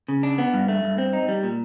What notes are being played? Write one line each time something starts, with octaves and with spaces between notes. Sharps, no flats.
C#3
D4
B3
G2
A3
G2
C4
D#4
G3
A#2